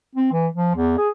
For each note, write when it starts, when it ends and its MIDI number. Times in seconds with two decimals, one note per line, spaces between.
0.15 0.30 60
0.32 0.48 52
0.54 0.73 53
0.75 0.95 40
0.97 1.09 68